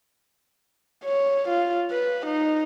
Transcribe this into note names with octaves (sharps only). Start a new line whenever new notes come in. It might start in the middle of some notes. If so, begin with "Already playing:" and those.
C#5
F4
B4
D#4